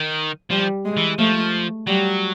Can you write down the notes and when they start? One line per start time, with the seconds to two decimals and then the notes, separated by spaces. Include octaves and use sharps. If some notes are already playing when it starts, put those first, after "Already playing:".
Already playing: D#3
0.50 F3 G3
0.85 G#3
0.97 E3
1.19 F3 A3
1.87 F#3 G3